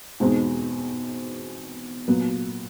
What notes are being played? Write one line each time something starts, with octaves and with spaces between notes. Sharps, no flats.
E2 B2 G#3 C4 D#4
A#2 F#3 B3